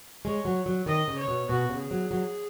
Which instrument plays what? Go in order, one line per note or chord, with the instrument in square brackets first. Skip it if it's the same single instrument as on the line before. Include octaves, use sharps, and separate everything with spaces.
[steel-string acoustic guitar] G#3 [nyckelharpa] C#5
[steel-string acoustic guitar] F#3
F#3
[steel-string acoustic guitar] D#3 [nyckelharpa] D#5
[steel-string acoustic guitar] C#3
[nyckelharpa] C#5
[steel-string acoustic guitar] B2
[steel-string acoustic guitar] B2 [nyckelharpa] F#4
[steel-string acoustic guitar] C#3
[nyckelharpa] G#4
[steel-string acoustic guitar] F#3
F#3